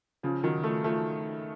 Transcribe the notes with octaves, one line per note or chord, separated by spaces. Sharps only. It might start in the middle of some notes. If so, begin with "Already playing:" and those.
C#3 F3
D#3 F#3
F3 A3
F3 A3